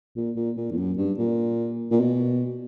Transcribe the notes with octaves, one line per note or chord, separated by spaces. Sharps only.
A#2
A#2
A#2
E2
F#2
G2
A#2
A#2
B2